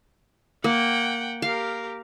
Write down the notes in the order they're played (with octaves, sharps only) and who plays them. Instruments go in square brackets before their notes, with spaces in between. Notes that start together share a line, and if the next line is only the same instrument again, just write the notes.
[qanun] A#3 [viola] F#5 G5
[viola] G4 A#4 [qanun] F5